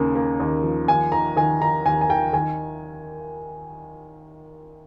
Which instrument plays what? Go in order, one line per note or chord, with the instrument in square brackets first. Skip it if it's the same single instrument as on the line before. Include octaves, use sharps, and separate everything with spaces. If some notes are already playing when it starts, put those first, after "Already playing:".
Already playing: [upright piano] D#2 C#3 A#3
A#3
D#2
F3
D#2 G#5
D#3 A#5
D#3 G#5
D#3 A#5
D#2 G#5
G#5
D#3 G5
D#3 G#5